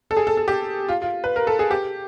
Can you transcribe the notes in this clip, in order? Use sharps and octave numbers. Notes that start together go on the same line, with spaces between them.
A4
G#4
A4
A4
G4
F4
F4
B4
A#4
A4
G#4
G4